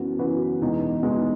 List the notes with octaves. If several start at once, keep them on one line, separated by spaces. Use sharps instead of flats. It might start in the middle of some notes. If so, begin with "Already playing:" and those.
Already playing: F#2 E3 B3 F#4
F#2 E3 B3 F#4 B4
E2 B2 G#3 D#4
E2 B2 G#3 D#4